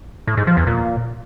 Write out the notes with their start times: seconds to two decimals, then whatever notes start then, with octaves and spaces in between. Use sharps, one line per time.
0.27 A2
0.37 G#2
0.47 F3
0.57 E2
0.67 A#2